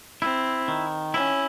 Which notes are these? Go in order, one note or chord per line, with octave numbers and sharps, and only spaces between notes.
C4 E4
D#3
C#4 E4